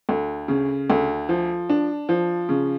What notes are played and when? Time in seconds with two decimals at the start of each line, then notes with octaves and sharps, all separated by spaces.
0.09 D2
0.48 C#3
0.90 D2
1.29 F3
1.70 D4
2.09 F3
2.49 C#3